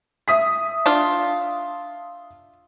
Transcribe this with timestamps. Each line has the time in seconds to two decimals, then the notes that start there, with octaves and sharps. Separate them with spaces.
0.28 E5 D#6 B6
0.86 D4 F4